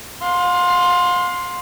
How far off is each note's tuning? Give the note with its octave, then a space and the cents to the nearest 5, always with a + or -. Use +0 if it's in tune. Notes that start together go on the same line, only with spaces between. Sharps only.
F5 +40 C6 +5